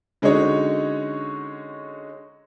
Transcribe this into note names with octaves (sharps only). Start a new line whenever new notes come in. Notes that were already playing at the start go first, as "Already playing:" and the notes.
D3 G#3 C#4 D#4 F#4 C#5